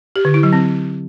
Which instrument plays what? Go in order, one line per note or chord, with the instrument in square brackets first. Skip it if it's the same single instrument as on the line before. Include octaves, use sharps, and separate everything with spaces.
[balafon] G4
D3
E4
F#3
C4